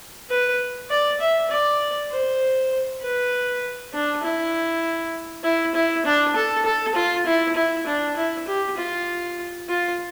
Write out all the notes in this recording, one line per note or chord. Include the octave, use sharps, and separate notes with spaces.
B4
D5
E5
D5
C5
B4
D4
E4
E4
E4
D4
A4
A4
F4
E4
E4
D4
E4
G4
F4
F4